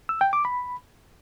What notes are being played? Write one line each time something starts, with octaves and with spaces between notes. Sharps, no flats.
E6
G5
D6
B5